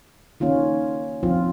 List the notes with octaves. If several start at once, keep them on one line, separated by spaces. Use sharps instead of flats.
D#3 A#3 C#4 F4
F3 C4 F4